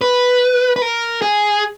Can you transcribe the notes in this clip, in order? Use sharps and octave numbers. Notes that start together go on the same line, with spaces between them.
B4
B4
A#4
G#4